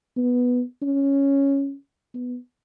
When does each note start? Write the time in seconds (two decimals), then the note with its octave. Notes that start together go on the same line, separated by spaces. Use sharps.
0.17 B3
0.82 C#4
2.14 B3